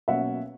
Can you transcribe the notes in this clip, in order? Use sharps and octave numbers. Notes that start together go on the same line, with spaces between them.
B2 F#3 A#3 C#4 E5 F#5